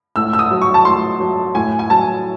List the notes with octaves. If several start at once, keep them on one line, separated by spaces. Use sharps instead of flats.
A2 E6
E6
D#6
F#3
C#6
A5
A2 C6
F#3
A2 G#5
G#5
F#3 A5